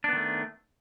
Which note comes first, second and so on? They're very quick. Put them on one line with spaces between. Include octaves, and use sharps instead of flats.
D4 B3 D#3 A3